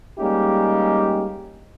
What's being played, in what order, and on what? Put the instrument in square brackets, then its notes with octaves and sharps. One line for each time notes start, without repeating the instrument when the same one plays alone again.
[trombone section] G3 G#3 A#3 C#4 D#4 G4